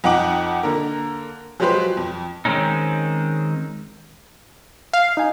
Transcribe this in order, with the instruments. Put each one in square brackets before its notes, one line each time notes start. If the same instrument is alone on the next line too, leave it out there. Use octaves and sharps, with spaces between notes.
[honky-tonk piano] F2 D#4 F#5 G5 D6 F#7
D3 A#3 A#4
F3 F#3 G#3 G4 B4 C5
F2
[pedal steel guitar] D#3 G#3 C4 C#4 D#4
[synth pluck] F5
[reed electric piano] D#4 G#5